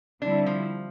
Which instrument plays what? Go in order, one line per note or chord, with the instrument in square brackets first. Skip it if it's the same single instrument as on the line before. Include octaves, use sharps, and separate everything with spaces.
[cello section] D3 G3 C4 E4 [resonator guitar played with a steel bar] D4
[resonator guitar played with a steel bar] F3